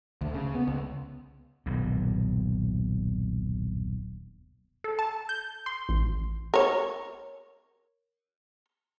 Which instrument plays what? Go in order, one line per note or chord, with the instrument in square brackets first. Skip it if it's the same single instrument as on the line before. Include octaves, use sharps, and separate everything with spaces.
[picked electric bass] D2
C#3
B3
C#2
[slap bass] D#1 B1 G2
[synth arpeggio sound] A4
A5
G6
C6
A1
[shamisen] A#4 C#5